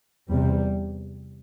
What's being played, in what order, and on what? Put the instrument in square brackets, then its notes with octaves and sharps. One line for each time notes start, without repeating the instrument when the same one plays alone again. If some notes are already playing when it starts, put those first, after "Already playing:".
[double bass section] E2 C3 G3